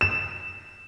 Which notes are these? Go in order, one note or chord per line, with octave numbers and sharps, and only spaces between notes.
E7